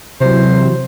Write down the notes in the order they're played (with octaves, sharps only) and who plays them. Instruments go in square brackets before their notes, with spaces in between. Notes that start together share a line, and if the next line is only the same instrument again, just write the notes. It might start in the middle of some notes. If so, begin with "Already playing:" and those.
[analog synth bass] C3 [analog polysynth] E3 F#3 [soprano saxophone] C5